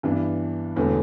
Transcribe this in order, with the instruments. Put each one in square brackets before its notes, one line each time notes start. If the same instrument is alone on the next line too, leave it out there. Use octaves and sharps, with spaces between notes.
[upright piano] G2 E3 B3 D4
E1 E2 D3 A3